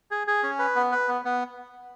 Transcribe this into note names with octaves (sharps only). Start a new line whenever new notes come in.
G#4
G#4
C#4
B4
B3
B4
B3
B3